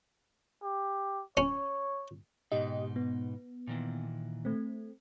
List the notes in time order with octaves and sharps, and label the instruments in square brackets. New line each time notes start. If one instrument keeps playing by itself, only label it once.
[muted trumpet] G4
[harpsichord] C#4 [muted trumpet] C#5
[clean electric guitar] G#2 B2 D#4 [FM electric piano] G4 D#5
[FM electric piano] B3
[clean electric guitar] A#2 D#3 E3
[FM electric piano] A3 C4